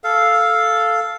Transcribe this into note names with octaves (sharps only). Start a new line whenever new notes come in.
A4 F5